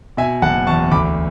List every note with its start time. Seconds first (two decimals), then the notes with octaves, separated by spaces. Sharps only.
0.17 B2 E5 G#5
0.42 F#1 F#5 A5
0.67 E2 A5 C#6
0.91 D2 B5 D6